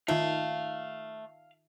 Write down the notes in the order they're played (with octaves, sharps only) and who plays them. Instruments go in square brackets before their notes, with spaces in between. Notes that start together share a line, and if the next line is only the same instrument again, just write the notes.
[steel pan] D#3 D#4 F4 [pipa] A3 [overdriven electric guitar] F5